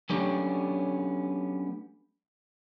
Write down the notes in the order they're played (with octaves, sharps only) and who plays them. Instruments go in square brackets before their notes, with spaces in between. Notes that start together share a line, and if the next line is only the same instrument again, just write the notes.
[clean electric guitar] F#3 A3 B3 C#4 D4 G4